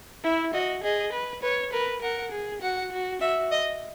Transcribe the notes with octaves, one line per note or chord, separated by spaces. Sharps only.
E4 E5
F#4 D#5
G#4 D#5
B4
B4 C#5
A#4 B4
A#4 F#5
G#4
F#4 F#5
F#4
F#4 E5
D#5